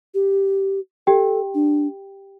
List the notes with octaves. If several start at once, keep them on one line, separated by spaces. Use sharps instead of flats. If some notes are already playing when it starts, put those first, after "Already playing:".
G4
G4 A4 G5
D4